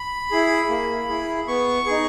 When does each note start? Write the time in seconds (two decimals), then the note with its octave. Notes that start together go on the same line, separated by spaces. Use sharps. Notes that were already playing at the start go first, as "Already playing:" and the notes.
Already playing: B5
0.31 E4 G#4
0.69 A#3
1.09 E4 G#4
1.48 B3 C#6
1.86 D#4 G#4